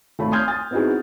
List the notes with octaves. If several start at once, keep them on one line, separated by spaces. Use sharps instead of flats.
G#1 A3 C#5 B5
G#5 C6 D#6 F6 G6 G#6
G#5 D#6 A6
B3 C4 D#4 E4 F#4 G#4